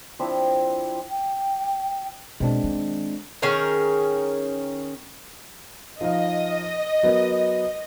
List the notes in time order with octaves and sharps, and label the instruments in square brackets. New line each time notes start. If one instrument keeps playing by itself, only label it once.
[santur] F3 C4 D4 E4
[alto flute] G5
[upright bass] B2 [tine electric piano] G#3 C4 D4
[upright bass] D#3
[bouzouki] D#3 C#4 G#4 A#4
[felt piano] F3 D#4 F5 [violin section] D#5
[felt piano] F#3 B3 A#4